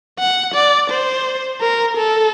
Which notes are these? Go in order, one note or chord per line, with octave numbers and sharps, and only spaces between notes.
F#5
D5
C5
A#4
A4